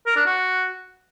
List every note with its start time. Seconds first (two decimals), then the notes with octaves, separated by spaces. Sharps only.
0.06 A#4
0.16 D4
0.26 F#4